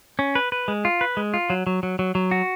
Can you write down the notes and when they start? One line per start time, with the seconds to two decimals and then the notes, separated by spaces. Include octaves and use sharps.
0.19 C#4
0.35 B4
0.52 B4
0.68 G#3
0.85 F4
1.01 B4
1.17 G#3
1.34 F4
1.50 F#3
1.67 F#3
1.83 F#3
1.99 F#3
2.15 F#3
2.31 F#4